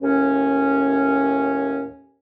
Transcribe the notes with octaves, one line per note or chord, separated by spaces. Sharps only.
D#2 A2 C#4